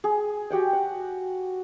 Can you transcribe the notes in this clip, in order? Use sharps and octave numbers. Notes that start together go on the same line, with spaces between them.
G#4
F#4 G4 F#5 G5
F#5